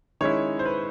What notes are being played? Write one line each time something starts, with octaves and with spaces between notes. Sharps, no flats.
D#3 G#3 C#4 E4 C#5
C5
B4